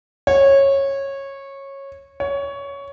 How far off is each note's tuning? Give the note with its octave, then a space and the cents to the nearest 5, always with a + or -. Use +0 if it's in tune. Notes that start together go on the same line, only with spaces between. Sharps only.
C#5 -15
C#5 +15